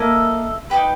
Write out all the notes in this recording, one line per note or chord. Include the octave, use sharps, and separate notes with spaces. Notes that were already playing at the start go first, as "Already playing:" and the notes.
Already playing: A#3 E4 A4 D#5
D#4 G4 B4